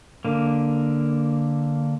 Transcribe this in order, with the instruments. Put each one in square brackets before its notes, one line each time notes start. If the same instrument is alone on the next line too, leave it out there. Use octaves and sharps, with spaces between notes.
[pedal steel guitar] D3 A#3